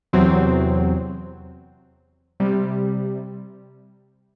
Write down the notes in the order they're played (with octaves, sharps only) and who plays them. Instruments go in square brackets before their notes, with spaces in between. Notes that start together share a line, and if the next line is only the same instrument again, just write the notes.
[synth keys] E2 C3 F#3 C4
C3 G3